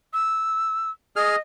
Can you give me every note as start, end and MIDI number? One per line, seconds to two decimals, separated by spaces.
0.13 0.90 88
1.16 1.36 68
1.16 1.38 75
1.16 1.36 89